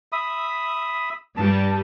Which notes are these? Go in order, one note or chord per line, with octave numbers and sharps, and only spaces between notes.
E5 B5 D#6
G2 G3 A5